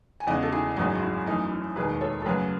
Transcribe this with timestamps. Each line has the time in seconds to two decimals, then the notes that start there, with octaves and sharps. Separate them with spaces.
0.20 G#5
0.27 E2 C#3 G#3 D#5 F#5
0.42 A4
0.52 E4 G#4
0.76 G#1 F#2 E3 G#3 D#4 F#4
0.95 F#4
1.02 E4
1.26 F#2 E3 A3 D#4
1.51 E4
1.76 E1 D#2 D#3 G#4 B4
2.01 A4 C#5
2.22 A4
2.25 F#2 C#3 F#3 A3 G#4 B4